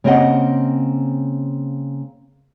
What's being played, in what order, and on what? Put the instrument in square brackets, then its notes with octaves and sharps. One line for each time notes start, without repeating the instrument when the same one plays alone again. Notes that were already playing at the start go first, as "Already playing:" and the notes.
[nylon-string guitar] C#3 A#3 C4 C#5 D#5 F#5